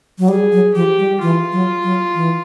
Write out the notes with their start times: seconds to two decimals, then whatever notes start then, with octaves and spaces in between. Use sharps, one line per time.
0.19 F#3
0.28 G3 G#4
0.52 F#3
0.75 F3 G4
0.99 G3
1.22 E3 F4
1.52 F#3
1.83 F#3
2.15 E3